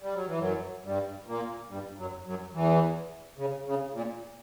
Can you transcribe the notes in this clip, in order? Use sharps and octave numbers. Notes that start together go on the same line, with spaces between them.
G3
F#3
E3
F#2 F#3
G2 G3
A#2 A#3
G2 G3
F#2 F#3
F#2 F#3
E2 E3
C#3
C#3
A#2